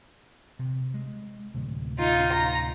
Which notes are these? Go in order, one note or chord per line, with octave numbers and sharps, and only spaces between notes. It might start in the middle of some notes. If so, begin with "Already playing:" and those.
C3
G#3
D2 A2 C3
D#4 F4
A#5